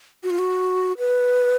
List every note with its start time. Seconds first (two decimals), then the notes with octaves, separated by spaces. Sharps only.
0.23 F#4
0.30 F4
0.39 F#4
0.98 B4